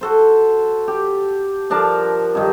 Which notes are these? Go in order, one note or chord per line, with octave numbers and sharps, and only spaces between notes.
F#4 A4 C5
G4
F3 D4 A#4 A5
G2 D#3